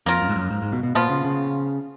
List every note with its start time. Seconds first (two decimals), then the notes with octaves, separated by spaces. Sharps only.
0.06 F2 A#3 F4 A#4
0.22 F#2
0.29 G#2
0.36 F#2
0.51 G#2
0.62 G#2
0.72 B2
0.83 B2
0.95 A#2 F3 B3 F4
1.10 C#3
1.25 C#3